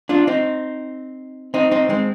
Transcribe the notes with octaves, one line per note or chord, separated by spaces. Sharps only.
D4 F4
C4 D#4
C4 D#4
C4 D#4
G#3 C4